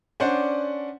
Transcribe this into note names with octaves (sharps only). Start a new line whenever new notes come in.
C#4 D4 C5 D5 F#5